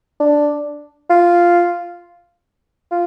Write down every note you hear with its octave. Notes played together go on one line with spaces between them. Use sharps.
D4
F4
F4